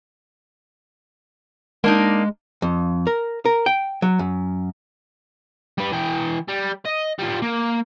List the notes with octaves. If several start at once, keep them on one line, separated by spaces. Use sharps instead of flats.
G#3 A#3 D4 D#4
F2
A#4
A#4
G5
F#3
F#2
G3 B4
E3 G5
G3
D#5
G3 F4
A#3